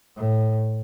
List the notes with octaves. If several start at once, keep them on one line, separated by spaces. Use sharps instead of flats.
A2